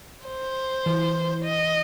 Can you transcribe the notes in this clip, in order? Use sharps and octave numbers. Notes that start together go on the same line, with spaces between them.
C5
E3
D#5